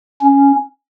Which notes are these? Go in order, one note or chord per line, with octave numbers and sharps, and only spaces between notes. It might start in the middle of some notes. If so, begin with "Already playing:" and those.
C#4